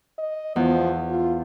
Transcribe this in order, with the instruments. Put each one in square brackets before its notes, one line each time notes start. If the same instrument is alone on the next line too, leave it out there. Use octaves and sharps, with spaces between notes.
[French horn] D#5
[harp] E2 [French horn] F3
[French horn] F4